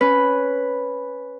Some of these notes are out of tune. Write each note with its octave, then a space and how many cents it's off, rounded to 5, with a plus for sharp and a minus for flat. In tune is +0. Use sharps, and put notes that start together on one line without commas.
C#4 +0 B4 +0